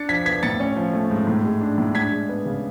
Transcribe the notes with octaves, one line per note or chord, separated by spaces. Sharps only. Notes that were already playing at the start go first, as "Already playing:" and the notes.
Already playing: D4 A6 C#7
F3 G#6 B6
B3 G#6 B6
A2 A6 C#7
C#4
F3
A3
G#2
A2
G#3
D4
A2
D4 G#6 B6
G#3
B3
C#3